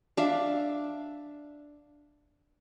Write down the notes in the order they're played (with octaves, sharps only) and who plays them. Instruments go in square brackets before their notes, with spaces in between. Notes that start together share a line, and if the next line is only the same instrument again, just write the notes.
[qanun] D4 E5 F5